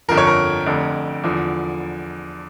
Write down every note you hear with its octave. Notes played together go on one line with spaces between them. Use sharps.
G1 F2 D3 F3 A#4
C#5
A#4
F1 F2 D3
E2 D3 F3